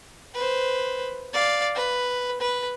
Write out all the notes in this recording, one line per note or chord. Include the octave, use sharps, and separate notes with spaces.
B4 C5
D5 F5
B4
B4